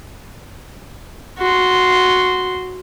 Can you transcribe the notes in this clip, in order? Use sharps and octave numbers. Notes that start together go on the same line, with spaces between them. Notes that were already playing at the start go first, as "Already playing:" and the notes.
F#4 C6